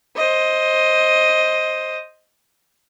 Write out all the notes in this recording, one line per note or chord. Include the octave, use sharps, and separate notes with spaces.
C5 D#5